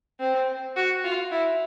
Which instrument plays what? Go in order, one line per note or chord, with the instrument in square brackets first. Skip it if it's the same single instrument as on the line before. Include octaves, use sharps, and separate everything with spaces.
[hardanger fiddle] C4
F#4
F4
E4